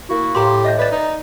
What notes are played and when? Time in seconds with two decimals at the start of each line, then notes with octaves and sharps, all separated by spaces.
0.08 A#3 E4 F#4
0.35 A2 G4 F5 A#5 C6
0.64 D#5 E5 G6
0.79 B4 D5 A6
0.92 D#4